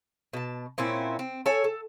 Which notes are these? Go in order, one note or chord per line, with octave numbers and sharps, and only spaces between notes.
B2 A5
A#2 C4 C#4 E4
C4
A4 C#5 G#5
A4